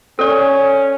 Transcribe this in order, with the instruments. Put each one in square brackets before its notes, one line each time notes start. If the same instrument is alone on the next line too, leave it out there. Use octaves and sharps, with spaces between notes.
[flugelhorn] C#4 [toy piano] A4 D5